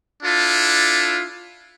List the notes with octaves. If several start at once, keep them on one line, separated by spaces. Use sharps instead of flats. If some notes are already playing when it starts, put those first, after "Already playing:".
D4 E4 F4 A4